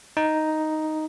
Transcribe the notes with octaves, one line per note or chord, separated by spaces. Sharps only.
D#4